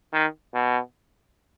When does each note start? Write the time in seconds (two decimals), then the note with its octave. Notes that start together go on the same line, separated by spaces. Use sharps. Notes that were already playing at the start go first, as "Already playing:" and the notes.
0.13 D#3
0.54 B2